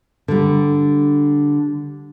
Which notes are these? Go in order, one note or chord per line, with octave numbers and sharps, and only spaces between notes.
D3 G3